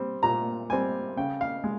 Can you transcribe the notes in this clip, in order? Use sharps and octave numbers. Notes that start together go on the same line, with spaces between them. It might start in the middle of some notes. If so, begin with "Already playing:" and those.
Already playing: G3 C4
A#2 A#5
G3 C4 G#5
C#3 G5
F5
G#3